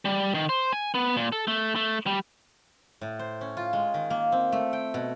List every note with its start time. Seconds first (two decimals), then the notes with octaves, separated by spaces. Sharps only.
0.05 G3
0.35 D#3
0.49 C5
0.73 G#5
0.95 B3
1.16 A#2
1.32 A4
1.48 A3
1.76 A3
2.07 G3
3.01 A2
3.19 C5
3.41 C#4
3.57 F4
3.73 G#3
3.94 D#3
4.10 A#3
4.32 C4
4.52 A3
4.73 G5
4.94 B2